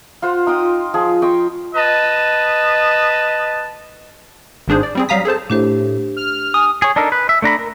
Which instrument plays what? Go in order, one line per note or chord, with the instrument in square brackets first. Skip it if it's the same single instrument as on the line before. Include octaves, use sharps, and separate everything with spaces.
[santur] F4 C5 F#5
D#4 F4 G5 D#6
F3 G#4
D#5 G5 C6 C#6
[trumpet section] B4 D#5 A5
[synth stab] G#1 G#2 D4 G#4 C5
D5
G3 C4 G#4
F#3 G3 F5 A#5 D#6 B6
G#4 A4 C5 A5
[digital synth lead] A2 [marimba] D4 G4 C5
[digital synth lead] F6
[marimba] G#5 [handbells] D#6
[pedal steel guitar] G#4 C#5
D4 D#4 A4 A#4
B4
E5
A3 D4 A#5 B5
A#4